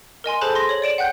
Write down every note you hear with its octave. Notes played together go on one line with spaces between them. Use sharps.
A#4 D#5 G#5 C6
G#4 A4 C5 A5 B5 F#6
C6 A#6
C#5 F#7
D5 D7 E7 F#7
F#5 G5 F#6 G6